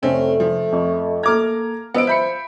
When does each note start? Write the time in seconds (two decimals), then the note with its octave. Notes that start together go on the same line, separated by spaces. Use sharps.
0.03 F1 A3 C4 C#4 A4
0.40 F3
0.72 F2 C#6
1.23 A#3 A4 A#5 D6 F6 G#6
1.94 F3 B3 D5 D#5 E6 D7
2.07 E5 B5 G6 C#7